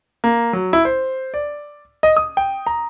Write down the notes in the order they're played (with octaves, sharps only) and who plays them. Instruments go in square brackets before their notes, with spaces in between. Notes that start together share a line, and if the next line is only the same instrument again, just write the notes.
[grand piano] A#3
F#3
E4
C5
D5
D#5
D#6
G5
A#5